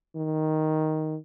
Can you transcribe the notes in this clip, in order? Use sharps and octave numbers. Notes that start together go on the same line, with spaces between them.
D#3